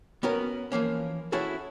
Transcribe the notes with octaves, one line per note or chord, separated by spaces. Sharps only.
B3 C#4 F#4 A#4
E3 F3 A#3 C#4
C#4 E4 F#4 G#4 A4